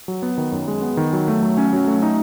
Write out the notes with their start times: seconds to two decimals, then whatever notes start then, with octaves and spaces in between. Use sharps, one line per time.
0.08 F#3
0.22 B3
0.38 D#3
0.52 F#2
0.68 G#3
0.82 B3
0.97 D#3
1.13 F#3
1.28 A3
1.43 F#3
1.58 C#4
1.73 F#3
1.87 A3
2.02 D#4